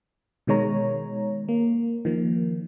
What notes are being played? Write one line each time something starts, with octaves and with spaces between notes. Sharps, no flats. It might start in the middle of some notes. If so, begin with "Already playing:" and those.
B2 D#3 G#3 C#5 A#5
A#3
D#3 F3 A#3